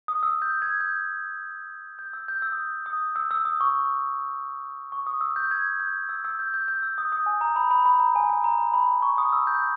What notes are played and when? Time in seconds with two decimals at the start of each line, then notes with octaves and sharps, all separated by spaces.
0.08 D#6
0.23 E6
0.42 G6
0.62 G#6
0.81 G6
1.99 G6
2.13 E6
2.28 G6
2.42 E6
2.52 D#6
2.58 E6
2.86 D#6
3.16 E6
3.31 E6
3.45 D#6
3.61 C#6
4.92 C#6
5.07 D#6
5.21 E6
5.36 G6
5.51 G#6
5.80 G6
6.09 E6
6.24 E6
6.39 G6
6.54 G6
6.68 G6
6.83 E6
6.98 D#6
7.12 D#6
7.26 G#5
7.41 A#5
7.56 B5
7.71 B5
7.86 B5
8.00 A#5
8.16 G#5
8.30 G#5
8.44 A#5
8.74 B5
9.02 C#6
9.18 D#6
9.32 E6
9.47 G6